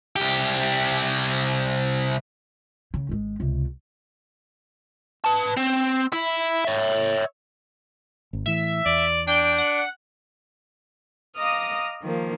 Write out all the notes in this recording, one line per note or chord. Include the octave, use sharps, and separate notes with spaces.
C2 G4
C#3
G#1 G#3
C#2 C3
B4 A5
C4
E4
C#5 E5
G#1
A2 E3 E5
E2 D5
D4 G5
F#5
D#5 F5 A#5 D6 D#6 F6
D#3 F3 A#3